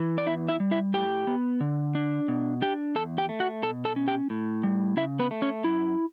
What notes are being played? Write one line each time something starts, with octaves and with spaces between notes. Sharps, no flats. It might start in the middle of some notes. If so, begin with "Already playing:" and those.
Already playing: E3
D5
E2 E4 E5
E4 E5
G3
E4 E5
A2 G4 G5
B3
D3
D4
B2
D4 G4 G5
E2 A4 A5
G4 G5
A3
F#4 F#5
B2 A4 A5
A4 A5
C#4
G4 G5
A2
G3
C#3 E4 E5
B3 B4
A3
C#4 C#5
F#2 E4